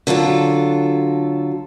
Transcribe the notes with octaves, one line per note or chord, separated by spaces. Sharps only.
D3 F#3 F4 A4